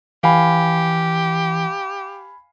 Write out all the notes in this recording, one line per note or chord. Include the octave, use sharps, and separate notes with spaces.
E3 G4 F5 G#5 B5